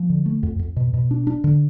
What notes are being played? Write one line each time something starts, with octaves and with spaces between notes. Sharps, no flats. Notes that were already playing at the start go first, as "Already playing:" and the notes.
Already playing: F3
D3
A3
F2
F2
B2
B2
D4
D4
D3